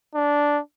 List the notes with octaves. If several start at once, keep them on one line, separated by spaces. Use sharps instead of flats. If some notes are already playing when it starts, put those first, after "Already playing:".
D4